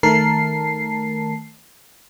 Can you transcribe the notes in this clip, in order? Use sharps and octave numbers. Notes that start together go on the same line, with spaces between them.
D#3 A3 A#4 A5 C7